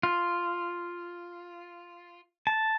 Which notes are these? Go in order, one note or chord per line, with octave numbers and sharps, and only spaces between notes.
F4
A5